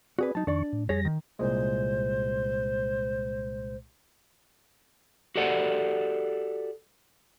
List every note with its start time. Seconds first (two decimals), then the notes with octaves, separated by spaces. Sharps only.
0.19 C4 F#4 G#4 B4 D5
0.35 F#3 D#4 A5
0.47 F2 D#3 D4 D5 C#6
0.73 A2
0.89 F2 G3 G#4 C#5 A#6
1.05 D#3
1.39 C2 A#2 G#3 C5
5.36 F#4 G4 A4 D5 F#5